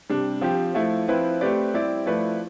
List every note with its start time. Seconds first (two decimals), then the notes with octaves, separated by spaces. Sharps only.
0.10 C3 G3 D4
0.41 F3 C4 G4
0.74 F3 A3 E4
1.08 F3 C4 E4 B4
1.41 A3 C4 G4 B4 D5
1.74 G3 C4 E4 G4 D5
2.06 F3 A3 E4 B4 D5